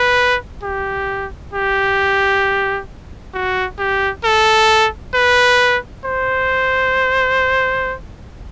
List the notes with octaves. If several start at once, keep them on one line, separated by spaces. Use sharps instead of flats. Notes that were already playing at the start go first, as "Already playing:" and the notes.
Already playing: B4
G4
G4
F#4
G4
A4
B4
C5